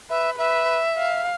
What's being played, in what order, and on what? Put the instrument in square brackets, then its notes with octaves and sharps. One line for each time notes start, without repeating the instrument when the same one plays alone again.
[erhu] B4 [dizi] E5
[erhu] B4 [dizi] E5
[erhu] F5